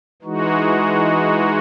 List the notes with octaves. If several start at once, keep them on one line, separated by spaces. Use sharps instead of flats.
E3 G#3 D#4 F#4